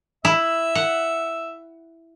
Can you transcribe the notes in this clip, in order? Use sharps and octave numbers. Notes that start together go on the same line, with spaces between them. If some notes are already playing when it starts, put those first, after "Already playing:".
E4 E5
F#5